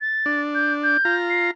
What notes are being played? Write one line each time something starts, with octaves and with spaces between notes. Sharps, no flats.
A6
D4
G6
G6
F4 A#5
C7